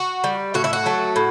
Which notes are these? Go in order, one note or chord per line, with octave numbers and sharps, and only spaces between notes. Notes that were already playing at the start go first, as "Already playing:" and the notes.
Already playing: F#4
G3
A2 F#4
E4
F#4
F#3 A3
A2